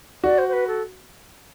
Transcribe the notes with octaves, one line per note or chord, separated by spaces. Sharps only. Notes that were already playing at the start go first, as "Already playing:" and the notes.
F#4 D5
C5
C5
B4
A4